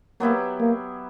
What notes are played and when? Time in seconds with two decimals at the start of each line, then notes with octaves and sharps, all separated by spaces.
0.20 F#3 A#3 B3 E4 G4
0.60 A#3